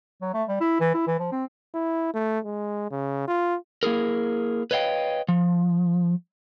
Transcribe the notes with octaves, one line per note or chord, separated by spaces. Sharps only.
F#3
A3
G3
E4
E3
E4
E3
F3
C4
E4
A3
G#3
C#3
F4
A#3 E4 G#4 A#4
B4 C#5 D#5 F5 G5
F3